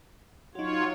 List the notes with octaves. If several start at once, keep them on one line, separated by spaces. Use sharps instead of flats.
F#3 D#4 F4 F#4 C#5